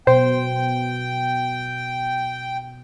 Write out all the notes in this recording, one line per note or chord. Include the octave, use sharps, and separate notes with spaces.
B2 C5 G5